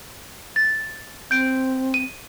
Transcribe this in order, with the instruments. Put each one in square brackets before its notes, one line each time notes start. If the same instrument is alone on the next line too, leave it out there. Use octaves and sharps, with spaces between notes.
[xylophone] A6
[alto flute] C4 [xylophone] G6 D7
[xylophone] D#7